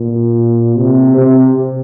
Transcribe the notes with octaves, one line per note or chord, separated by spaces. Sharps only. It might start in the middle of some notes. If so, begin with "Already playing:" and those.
Already playing: A#2
C3
C3